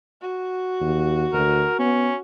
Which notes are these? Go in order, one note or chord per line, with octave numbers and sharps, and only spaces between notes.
F#4
D#2
D2 A#4
B3 C#4